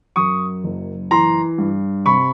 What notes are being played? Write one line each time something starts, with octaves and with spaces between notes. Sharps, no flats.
F#2 C#6 D#6
F#1
E3 A#5 C6
G2
C3 B5 C#6